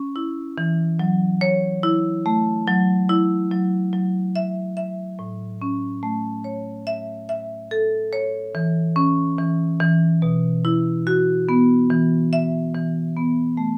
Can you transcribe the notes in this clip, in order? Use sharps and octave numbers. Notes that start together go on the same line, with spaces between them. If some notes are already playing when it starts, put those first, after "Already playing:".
Already playing: C#4
E4
E3
F#3
C#5
E4
A3
F#3
E4
F#3
F#3
E5
E5
A2
C#4
A3
C#5
E5
E5
A4
C#5
E3
C#4
E3
E3
B2
E4
F#4
B3
E3
E5
E3
B3
A3